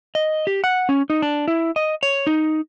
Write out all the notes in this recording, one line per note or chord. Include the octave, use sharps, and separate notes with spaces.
D#5
G4
F#5
C#4
D#4
D4
E4
D#5
C#5
D#4